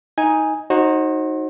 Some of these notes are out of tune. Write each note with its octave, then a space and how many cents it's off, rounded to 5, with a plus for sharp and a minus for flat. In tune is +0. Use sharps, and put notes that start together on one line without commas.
D#4 +15 G#5 -5
D#4 +0 F#4 +0 C5 +40